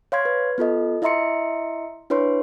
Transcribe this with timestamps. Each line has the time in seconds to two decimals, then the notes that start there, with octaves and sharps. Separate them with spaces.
0.12 C#5 F5 C6 G#6
0.25 B4
0.58 B3 F4 A4 D#5
1.02 E4 D#5 E5 A#5 C6 C#7
2.10 D4 E4 B4 C#5 C6